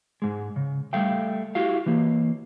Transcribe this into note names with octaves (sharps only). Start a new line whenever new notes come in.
G#2 G#3
C#3
G3 A3 F5 G5
E4 F#4 G4 F5
E3 A#3